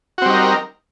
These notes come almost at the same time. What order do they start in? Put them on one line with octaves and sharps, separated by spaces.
F#4 C4 G3 D#4 A#4